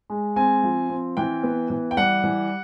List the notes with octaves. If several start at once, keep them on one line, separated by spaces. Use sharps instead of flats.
G#3
C4 G#5
F3
C4
E3 G5
B3
E3
G5
G3 F#5
E3